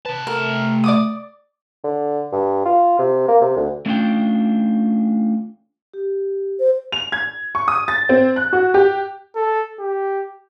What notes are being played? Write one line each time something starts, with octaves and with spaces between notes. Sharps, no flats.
C3 B4 A5
A3 A#4
D5 D6 D#6
D3
G2
F4
C3
A#3
C3
D2
A3 C#4 D4 E4 F4 G5
G4
C5
F7
G#6
C#6
D#6
A6
C4
F#6
F#4
G4
A4
G4